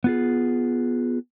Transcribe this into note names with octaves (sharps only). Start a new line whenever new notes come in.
B3 F4 G#4